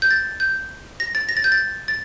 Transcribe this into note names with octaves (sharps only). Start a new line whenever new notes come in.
G6
A6
G6
A#6
A6
A#6
A6
G6
A6
A6